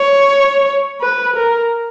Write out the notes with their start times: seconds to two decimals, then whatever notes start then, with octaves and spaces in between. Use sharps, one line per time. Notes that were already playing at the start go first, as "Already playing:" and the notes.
Already playing: C#5
1.01 B4
1.36 A#4